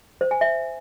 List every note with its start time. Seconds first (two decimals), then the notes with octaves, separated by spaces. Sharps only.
0.21 C5
0.31 G#5
0.41 E5